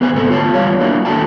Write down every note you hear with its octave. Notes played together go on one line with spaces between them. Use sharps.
B3 G#4 C5 G#5
D2 G#2 C3 G3 A4 C5
D2 F4 C#5 A5
E2 G3 F4 C#5 F5
F#3 A#3 D4 E4
D#2 A3 E4 F#4 G5 A5